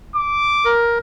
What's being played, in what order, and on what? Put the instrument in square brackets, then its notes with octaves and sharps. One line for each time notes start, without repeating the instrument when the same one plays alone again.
[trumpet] D6
[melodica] A#4